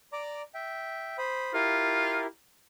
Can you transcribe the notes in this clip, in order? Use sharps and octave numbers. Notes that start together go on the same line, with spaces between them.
D5 A#5 D6
E5 G5
C5 B5 D#6
E4 F4 G4 A#4